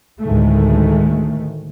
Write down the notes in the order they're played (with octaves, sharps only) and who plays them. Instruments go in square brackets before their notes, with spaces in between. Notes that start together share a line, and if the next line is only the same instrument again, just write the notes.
[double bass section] D2 A2 D#3 G#3 A3